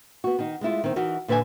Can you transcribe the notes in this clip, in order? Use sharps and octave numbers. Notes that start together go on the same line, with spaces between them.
B3 F#4
D#3 D#4
G#3 A3 E4 F4
D#3 C4
E3 D#4 F#4 A#4
A#2 D3 B4 E5 G#5